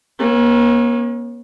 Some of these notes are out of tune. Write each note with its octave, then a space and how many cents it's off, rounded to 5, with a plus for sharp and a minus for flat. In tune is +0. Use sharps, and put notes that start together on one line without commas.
A#3 +40 C#4 -35